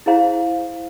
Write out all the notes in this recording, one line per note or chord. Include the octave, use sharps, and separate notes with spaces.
E4 G#4 C5 F5 A#5